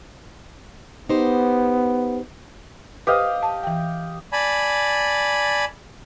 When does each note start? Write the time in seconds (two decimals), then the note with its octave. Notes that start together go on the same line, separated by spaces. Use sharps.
1.09 B3 D#4 G4 C5
3.07 G4 B4 C5 D#5 F5
3.43 A5
3.63 E3 G5
4.33 D5 G#5 A5 B5